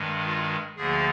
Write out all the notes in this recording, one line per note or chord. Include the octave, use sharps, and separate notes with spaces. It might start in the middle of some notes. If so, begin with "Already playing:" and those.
Already playing: G2 D#3 G#3
F4
D2 D3 F3 A#3 G#4